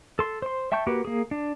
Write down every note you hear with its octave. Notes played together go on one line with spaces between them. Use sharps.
A4 C6
C5 C6
E5 G5 A5 C#6 G6
A#3 F#4 G4 B4
A#3 G#4
D4